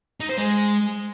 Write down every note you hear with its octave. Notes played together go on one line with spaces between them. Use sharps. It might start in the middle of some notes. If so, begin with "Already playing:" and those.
D#4
C5
G#3